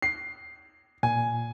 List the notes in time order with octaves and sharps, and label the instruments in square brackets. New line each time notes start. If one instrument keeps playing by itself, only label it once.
[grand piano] C7
[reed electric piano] A#2 [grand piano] G#5